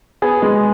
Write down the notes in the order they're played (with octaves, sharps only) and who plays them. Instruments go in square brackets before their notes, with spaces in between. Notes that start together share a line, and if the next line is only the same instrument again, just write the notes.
[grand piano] B3 [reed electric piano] G#4
[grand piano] G#3